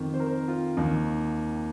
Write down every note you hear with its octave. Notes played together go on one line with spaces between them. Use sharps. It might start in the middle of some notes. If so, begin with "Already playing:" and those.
Already playing: F2 D#3
C5
A#4
F4
D#2 D#3 D#4